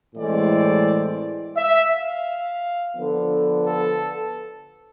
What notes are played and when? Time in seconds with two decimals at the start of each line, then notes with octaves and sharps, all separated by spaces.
0.15 A2 E3 G#3 C4 D5
1.57 E5
1.91 F5
2.97 D3 F3 B3 D4
3.67 A4